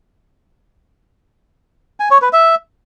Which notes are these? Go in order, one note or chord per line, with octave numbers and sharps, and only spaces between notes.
G#5
C#5
B4
E5